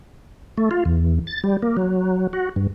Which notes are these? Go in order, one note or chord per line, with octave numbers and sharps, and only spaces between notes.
A3
F4
E2
A6
G3
A#3
F#3
F#4
G2